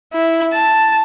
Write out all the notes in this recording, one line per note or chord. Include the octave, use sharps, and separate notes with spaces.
E4
A5